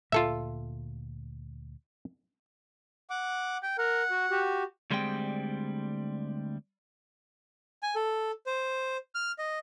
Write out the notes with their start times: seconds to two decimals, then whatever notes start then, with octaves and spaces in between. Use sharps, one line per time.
0.12 D2 A#2 A#3 F4 A4 E5
3.10 F#5 D6
3.63 G5
3.78 A#4 F#5
4.11 F#4
4.31 F#4 G4
4.90 D2 G3 G#3 C4 D5 G5
7.83 G#5
7.95 A4
8.46 C5
9.15 F6
9.38 D#5